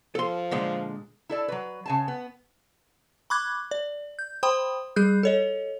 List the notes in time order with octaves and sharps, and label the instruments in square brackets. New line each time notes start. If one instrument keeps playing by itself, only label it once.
[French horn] F3 [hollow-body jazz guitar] A4 C6
[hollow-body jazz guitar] A#2 D3 G#3
[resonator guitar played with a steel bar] E4 A4 D5
F#3 B4
C#3 G#5 A5
B3
[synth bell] B5 C#6 D6 F#6 G#6
D5
G6
C5 G5 B5 C6 D#6
G3 G#4 F#6 G6
A4 C#5 D#5